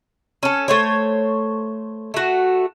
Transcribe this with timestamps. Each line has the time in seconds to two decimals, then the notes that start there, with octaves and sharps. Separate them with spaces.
0.43 C#4 A4
0.68 A3 C5 C#5
2.14 A3 F#4